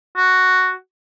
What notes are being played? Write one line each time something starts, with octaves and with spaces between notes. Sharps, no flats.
F#4